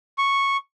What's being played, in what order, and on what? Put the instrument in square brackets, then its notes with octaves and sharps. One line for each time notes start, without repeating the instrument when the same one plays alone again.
[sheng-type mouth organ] C#6